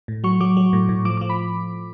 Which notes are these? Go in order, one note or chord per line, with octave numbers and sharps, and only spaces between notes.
A2
F#3 C#6
F#3 D6
F#3
A2
A2
F3 D6
D6
F3
B5